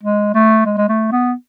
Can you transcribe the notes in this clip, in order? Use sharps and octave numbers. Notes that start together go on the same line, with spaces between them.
G#3
A3
G#3
G#3
A3
B3